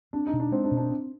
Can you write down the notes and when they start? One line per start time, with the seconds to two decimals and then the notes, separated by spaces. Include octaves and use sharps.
0.13 C4 D4
0.27 D#4
0.33 B2
0.40 D4
0.51 G#3 C4
0.64 D4
0.71 B2
0.77 D4
0.90 C4